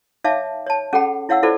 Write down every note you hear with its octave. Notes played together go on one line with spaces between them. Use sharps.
D#4 C#5 E5 F5 A5 D6
C#5 A5
C#4 G#4 A4 F#5 G5 B5
E4 C#5 F5 F#5 E6
E4 F4 A4 C5 D5